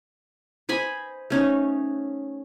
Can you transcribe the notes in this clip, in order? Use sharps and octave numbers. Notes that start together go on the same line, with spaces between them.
C5 D#5 G#5 B5
A3 C#4 D#4